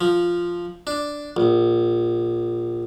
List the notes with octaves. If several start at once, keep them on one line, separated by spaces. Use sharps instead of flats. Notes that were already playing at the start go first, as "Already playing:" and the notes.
F3
D4
A#1